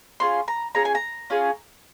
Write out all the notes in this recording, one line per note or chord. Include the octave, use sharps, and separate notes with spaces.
C#4 F4 G#4 C6
A#5
C#4 F4 G#4 A#5
G#5
A#5
C#4 F4 G#4